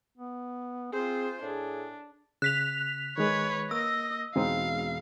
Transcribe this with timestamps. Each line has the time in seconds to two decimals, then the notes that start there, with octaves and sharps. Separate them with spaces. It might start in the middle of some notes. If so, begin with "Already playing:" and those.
0.17 B3
0.93 C4 F4 G#4 C5
1.42 A2 D4 G#4
2.42 C#3 F#6 B6 F7
3.18 D#3 G#3 B4 C#5
3.71 A#3 D#5 E6 A#6
4.36 E1 G#3 C4 D#4 F5